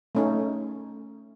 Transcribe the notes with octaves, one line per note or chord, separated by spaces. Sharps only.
A3 C#4 D#4